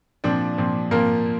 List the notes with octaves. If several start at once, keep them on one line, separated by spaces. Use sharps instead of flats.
A#2 F3 C4 D4 D5
A#2 F3 C4
A#2 F3 A#3 C4 A#4